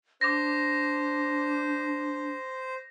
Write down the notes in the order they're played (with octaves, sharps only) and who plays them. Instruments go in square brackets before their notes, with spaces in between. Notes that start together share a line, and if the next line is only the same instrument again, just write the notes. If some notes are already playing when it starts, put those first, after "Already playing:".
[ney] D4 [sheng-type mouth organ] C5 [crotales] D6 A#6